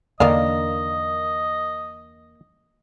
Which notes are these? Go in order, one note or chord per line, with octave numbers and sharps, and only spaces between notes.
E2 D3 D#3 A#3 D4 D#5 F5